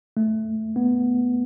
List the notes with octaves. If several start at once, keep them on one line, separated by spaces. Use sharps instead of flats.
A3
B3